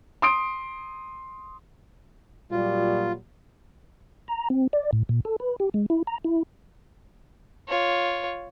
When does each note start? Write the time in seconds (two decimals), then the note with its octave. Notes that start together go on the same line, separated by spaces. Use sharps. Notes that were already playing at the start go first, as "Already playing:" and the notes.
0.22 C6 D#6 D7
2.51 A#2 F#3 G3 F4
4.28 A#5
4.50 C4
4.73 D5
4.93 A2
5.09 A#2
5.25 A4
5.40 B4
5.60 G4
5.74 G#3
5.90 E4
6.07 A#5
6.25 E4
7.68 F4 C#5